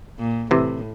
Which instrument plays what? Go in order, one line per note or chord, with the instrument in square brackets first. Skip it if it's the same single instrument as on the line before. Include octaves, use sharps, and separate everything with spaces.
[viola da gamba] A#2
[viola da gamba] A2 [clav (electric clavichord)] C3 E3